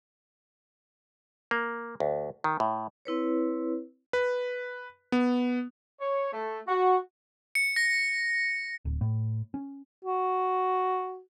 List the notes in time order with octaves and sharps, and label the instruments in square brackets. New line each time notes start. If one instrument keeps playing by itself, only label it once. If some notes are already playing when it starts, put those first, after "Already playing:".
[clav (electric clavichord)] A#3
D2
D#3
A2
[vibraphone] C4 E4 B4 C#5
[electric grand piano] B4
B3
[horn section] C#5
A3
F#4
[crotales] C#7
A#6
[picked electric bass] D1
A2
C#4
[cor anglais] F#4